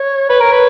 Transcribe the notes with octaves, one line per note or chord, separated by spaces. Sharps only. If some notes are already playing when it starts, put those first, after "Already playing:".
Already playing: C#5
B4 C#5
A#4
B4